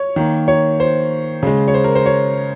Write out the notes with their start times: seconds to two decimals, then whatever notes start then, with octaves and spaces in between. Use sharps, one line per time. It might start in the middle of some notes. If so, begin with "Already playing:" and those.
Already playing: C#5
0.16 D#3 A#3
0.48 C#5
0.80 C5
1.43 C#3 G#3
1.68 C#5
1.74 C5
1.84 A#4
1.95 C5
2.06 C#5